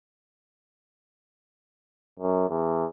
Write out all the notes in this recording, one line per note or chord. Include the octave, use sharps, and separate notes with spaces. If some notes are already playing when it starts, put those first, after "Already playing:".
F#2
E2